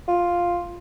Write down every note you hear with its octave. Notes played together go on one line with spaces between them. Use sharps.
F4